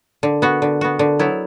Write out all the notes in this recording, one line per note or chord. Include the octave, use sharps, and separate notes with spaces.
D3
B3 F#4
D3
B3 F#4
D3
F#3 B3 E4